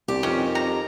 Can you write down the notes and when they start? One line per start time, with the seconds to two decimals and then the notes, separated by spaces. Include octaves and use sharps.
0.08 C2 G3 G4
0.23 F2 D#3 C#4
0.55 A#5